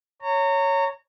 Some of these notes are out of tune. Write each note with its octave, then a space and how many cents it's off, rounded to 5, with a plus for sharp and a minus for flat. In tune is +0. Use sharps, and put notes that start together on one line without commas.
C#5 +0 A#5 -30